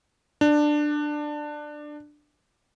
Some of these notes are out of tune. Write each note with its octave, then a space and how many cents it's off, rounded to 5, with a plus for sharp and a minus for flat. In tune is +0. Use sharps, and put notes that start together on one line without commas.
D4 +15